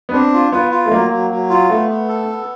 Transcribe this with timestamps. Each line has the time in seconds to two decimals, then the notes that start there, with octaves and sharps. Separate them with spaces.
0.09 B3
0.13 C4 D4
0.33 F4
0.52 B3 F4
0.71 F4
0.86 A3
0.92 F#3 A#3
1.11 F#3
1.31 F#3
1.50 F4
1.69 A3 B3
1.89 B3
2.08 A4
2.28 B3